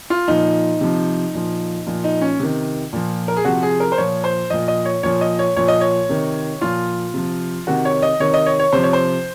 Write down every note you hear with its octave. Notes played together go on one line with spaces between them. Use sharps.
F4
A#2 F3 D#4
C3 F3
A#2 F3
A#2 F3
D#4
C#4
C3 D#3
A#2 F3
A#4
G#4
C3 F3 F#4
G#4
A#4
C5
A#2 F3 C#5
C5
A#2 F3 D#5
D#5
C#5
A#2 F3 C#5
D#5
C#5
A#2 F3 C#5
D#5
C#5
C3 D#3
A#2 F3 F4
C3 F3
C3 D#3 F#4
C#5
D#5
C3 D#3 C#5
D#5
C#5
C#5
C3 F3 C5
C#5
C5